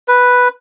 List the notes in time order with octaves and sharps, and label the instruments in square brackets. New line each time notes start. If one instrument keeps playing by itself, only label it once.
[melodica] B4